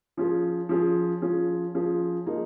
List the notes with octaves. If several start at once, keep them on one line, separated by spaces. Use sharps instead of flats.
F3 C#4 F4 G#4
F3 C#4 F4 G#4
F3 C#4 F4 G#4
F3 C#4 F4 G#4
F3 A#3 D#4 G#4